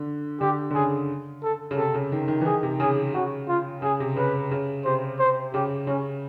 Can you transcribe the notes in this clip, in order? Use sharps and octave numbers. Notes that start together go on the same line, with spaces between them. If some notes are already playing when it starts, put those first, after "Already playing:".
Already playing: D3
D3 G4
D3
C#3 G#4
A4
C#3
C3 A4
C#3
D#3
D#3
E3
D#3 G#4
C3
C#3 G#4
C#3 F#4
F4
C#3 G#4
C3
C#3 B4
C#3
C3 C5
C5
C#3 G4
C#3 C#4